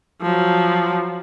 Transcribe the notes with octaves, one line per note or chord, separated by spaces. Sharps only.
F3 F#3